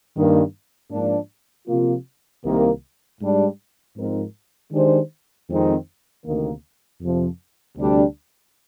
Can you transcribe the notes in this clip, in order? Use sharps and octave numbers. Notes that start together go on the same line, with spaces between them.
G2 D#3 A#3
G#2 F3 A#3 D4
C3 F3 A#3 F4
C2 C3 D#3 A#3
G#2 G3 D4
G#2 F3 C4 D#4 A#4
D#3 G#3 D4 G4 C5
F2 D#3 G#3 C4 D#4
D2 C3 D#3 A#3
F2 C3 F3
D2 C3 G3 D4 G4